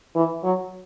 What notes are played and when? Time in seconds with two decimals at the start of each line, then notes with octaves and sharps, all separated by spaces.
0.15 E3
0.44 F#3